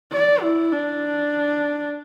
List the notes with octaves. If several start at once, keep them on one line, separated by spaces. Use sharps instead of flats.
D5
E4
D4